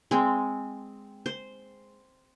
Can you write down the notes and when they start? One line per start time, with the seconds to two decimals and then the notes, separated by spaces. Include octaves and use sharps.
0.11 G#3 C4
1.26 C5